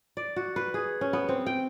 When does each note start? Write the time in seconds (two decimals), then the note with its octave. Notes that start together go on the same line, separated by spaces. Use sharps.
0.17 D5
0.36 F#4
0.56 B4
0.74 G#4
1.01 C#4
1.13 B3
1.29 C4
1.46 G5